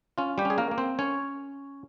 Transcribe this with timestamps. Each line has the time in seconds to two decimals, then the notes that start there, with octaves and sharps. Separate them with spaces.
0.18 C#4 F4
0.38 G3 G4
0.45 C#4
0.50 G#4
0.58 A#3 A#4
0.71 A#3
0.78 C4 C5
0.99 C#4 C#5